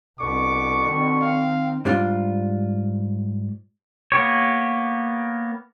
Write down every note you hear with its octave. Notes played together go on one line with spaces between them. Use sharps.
C2 B2 D3 B3 C#6 D6
D#3 C4
F5
G#2 G3 D4 F4
A#3 B3 G4 C#5